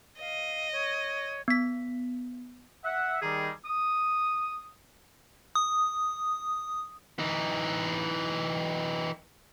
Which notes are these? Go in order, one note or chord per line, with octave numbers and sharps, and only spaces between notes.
D#5 F5
C#5
B3 B6
E5 F#5
D#3 G3 G#4
D#6
D#6
E3 D#4